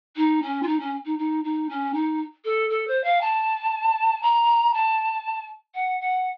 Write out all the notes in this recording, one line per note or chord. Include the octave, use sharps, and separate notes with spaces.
D#4
C#4
F4
D#4
C#4
D#4
D#4
D#4
C#4
D#4
A4
A4
C5
F5
A5
A#5
A5
F#5
F#5